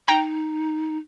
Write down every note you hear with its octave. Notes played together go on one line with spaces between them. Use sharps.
D#4 G5 A#5